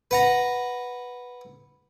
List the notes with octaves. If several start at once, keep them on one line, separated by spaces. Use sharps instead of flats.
B4 F#5 A#5